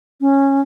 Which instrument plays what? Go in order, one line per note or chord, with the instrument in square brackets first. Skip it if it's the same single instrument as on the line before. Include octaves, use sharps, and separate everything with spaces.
[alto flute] C#4